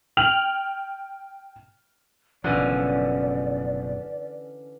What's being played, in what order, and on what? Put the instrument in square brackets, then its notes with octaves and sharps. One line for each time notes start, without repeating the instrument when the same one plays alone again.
[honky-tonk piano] G5 F6 F7 F#7
[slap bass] F#1 B2 F3 [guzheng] D3 E3 C#4 [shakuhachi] D5